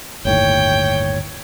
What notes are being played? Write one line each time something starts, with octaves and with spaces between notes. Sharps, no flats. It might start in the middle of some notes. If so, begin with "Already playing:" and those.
G1 D#2 A2 C#5 G5